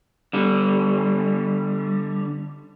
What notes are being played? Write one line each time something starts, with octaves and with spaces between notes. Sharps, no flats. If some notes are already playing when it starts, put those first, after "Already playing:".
D3 G3